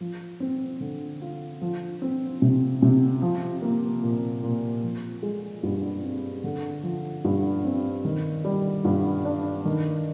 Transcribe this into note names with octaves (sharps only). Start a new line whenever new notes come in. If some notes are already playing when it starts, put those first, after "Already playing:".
F3
C4
D3
F4
F3
C4
C3
C3
F3
A#3
A#2
A#2
F3
G#3
G2
C4
D3
F3
G2
C4
D#3
G3
G2
D4
D#3